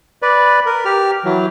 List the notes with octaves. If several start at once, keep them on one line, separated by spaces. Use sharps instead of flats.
B4 D5
A#4
G4 F6
E3 F#3